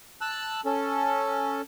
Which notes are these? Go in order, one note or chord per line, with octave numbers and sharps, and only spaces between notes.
A5 E6 F#6
C#4 A4